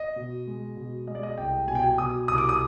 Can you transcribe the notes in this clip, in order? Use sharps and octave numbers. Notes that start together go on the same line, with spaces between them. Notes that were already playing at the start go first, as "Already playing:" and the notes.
Already playing: D#5
B2
G#3
B2
G#3 D#5
D5
D#5
C2 G5
B2 G#5
G5
G#5
B2 D#6
C2 D#6
D6
D#6